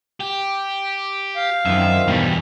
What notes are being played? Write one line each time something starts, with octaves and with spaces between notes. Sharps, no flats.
G4
F5
F#2 D#3 F3 C4 E5
E2 G2 B2 G3